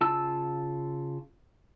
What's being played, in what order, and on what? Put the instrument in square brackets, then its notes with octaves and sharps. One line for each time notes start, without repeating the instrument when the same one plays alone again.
[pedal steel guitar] C#3 F4 A5 E6